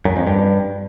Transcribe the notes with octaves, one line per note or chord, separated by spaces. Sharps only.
F#2
F2
G2